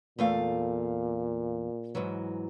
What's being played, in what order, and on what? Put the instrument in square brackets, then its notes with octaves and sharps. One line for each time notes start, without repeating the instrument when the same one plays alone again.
[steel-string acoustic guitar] E2 A3 F5 [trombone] A#2
[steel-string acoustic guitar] G#2 E3 F#3